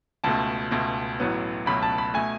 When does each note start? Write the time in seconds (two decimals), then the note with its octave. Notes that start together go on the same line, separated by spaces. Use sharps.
0.24 C#2 B2 A3 A5
0.71 C#2 B2 A3
1.20 A1 A2 F#3 B3
1.66 C#2 B2 F#3 A3 B5
1.82 A5
1.98 B5
2.14 B2 A3 G#5